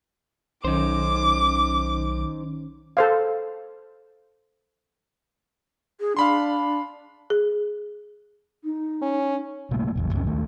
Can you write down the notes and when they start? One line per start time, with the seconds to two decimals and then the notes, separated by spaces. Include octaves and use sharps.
0.65 B1 D#3 C#4 D#4 C5 D6
2.97 A4 C5 F5
6.00 G#4
6.17 D4 F5 B5 C6
7.30 G#4
8.64 D#4
9.02 C#4
9.71 B2 G3 A3 A#3
9.95 E1 A#1 E2
10.13 C#2 F#2 C#3 C#4
10.27 D#2 D#3 A3